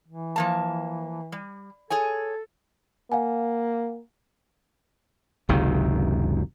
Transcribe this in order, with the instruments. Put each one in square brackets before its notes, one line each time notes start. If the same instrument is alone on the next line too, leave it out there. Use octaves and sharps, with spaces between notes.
[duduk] E3
[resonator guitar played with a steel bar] F3 A#3 A5
G3
[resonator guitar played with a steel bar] G#4 C#5 G#5 [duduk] A4
[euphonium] A#3 [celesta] F5 F#5 G#5
[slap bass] F#1 C#2 C3 D#3